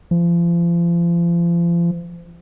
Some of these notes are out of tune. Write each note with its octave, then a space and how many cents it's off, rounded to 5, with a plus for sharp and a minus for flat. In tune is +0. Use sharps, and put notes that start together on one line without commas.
F3 -35